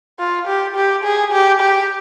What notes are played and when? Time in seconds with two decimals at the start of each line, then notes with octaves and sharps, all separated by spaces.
0.19 F4
0.47 G4
0.76 G4
1.04 G#4
1.32 G4
1.61 G4